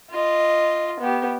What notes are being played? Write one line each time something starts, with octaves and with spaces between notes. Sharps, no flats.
F4 D#5
B3 G4